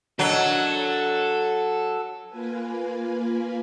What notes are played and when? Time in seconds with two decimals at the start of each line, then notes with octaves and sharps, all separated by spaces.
0.19 F#3 D4 A4 A#4 D#5
2.28 A#3 F4 B4 G#5